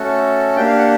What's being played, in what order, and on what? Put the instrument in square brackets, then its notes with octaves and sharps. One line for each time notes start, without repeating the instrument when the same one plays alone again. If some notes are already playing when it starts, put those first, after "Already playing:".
Already playing: [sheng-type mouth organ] A3 C#4 F#4 A4
A#3 D4 G4 G5
F5
F#5